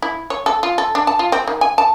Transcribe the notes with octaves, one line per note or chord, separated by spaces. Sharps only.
E4
C#5
A4
F4
A4
D4
A5
F4
C4
D#3
G#5
A5